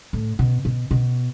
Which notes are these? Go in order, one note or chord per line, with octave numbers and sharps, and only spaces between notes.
A2
B2
B2
B2